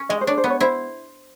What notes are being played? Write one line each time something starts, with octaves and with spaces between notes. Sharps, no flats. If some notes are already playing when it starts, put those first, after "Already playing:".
Already playing: C#4
G#3 D#5
C5
D4 C#5
C5
B3
C#5
E4 C5